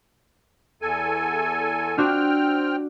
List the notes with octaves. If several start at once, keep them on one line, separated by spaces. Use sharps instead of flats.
E2 A4 G#5
C4 D4 F4 F#4 G5 F6